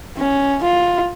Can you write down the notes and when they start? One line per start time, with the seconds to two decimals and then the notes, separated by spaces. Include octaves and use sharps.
0.17 C#4
0.63 F4